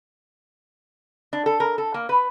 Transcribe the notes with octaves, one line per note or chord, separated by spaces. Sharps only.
D4
A4
A#4
A4
A#3
B4